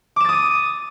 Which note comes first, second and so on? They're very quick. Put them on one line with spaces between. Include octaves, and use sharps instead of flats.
D6 E7 A6 D#6 D#7